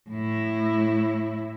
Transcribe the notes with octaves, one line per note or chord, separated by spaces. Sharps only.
A2 E4